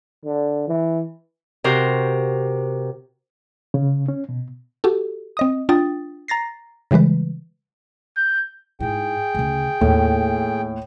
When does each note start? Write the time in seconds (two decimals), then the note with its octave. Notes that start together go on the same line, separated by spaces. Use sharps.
0.25 D3
0.68 E3
1.64 C3 F#4 A#4 C5
3.74 C#3
4.08 C#4
4.29 B2
4.84 F#4 G4 A4
5.37 C4 D#5 D#6
5.69 D4 F4 G5 D#6 A6
6.28 A#5 A6 A#6 C7
6.91 C#3 E3 G3 G#3 B4
8.17 G6
8.80 G#2 E4 G#4 G5
9.35 D2 C#3
9.81 D#2 A2